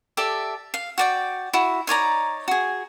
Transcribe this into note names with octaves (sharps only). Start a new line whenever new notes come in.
G4 A4 D5 E5
F5
F#4 D5 G5
E4 F#4
D#4 C#5 D5 A#5
F#4 G#4